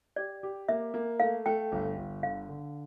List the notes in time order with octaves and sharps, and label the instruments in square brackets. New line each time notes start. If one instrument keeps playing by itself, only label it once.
[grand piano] G4 [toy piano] D5
[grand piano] G4
[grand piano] A#3 [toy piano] E5
[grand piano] A#3
[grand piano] A3 [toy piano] F5
[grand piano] A3 [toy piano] G5
[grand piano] G1
G1
[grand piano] D3 [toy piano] F5
[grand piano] D3